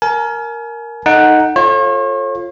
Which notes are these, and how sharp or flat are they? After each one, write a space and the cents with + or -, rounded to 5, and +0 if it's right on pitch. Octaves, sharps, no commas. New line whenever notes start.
A#4 +0 G#5 +35
D#4 +0 A4 +0 F#5 +0
F4 +0 A4 +0 C#5 -40